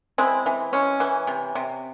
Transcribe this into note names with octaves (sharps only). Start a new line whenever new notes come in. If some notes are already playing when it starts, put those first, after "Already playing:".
G#3 C4 E4
E3
G#3 C#4
E3
C3
C3